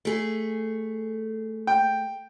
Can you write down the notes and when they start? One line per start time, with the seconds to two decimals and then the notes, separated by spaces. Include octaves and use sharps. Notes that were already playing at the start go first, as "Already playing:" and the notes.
0.05 A3 G#4
1.67 G5